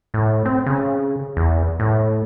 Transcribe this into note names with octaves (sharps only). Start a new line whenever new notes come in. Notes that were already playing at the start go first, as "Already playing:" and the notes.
A2
C4
C#3
E2
A2